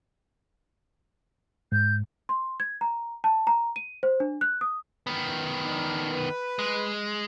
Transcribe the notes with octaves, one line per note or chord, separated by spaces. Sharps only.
G#2 G6
C6
G#6
A#5
A5
A#5
D#7
C5
D4
F#6
D#6
D#3 B3
D4 D#4
B4
G#3